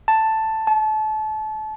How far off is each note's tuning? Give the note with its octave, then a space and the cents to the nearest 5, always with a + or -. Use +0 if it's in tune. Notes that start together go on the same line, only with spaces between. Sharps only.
A5 +5
A5 -30